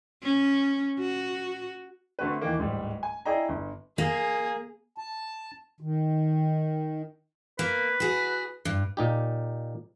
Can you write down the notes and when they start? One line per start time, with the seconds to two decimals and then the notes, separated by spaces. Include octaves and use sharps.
0.22 C#4
0.99 F#4
2.19 D3 A3 C4 F#4 B4
2.41 D#2 D#3 E3 A#3
2.59 D1 G#2 G3
3.03 G#5
3.25 E4 G#4 D5 D#5 G5 A#5
3.49 G1
3.98 A#3 G#4
4.98 A5
5.81 D#3
7.59 A#3 B4
8.00 F#4 G#4
8.65 G2
8.97 A#2 D#4 G4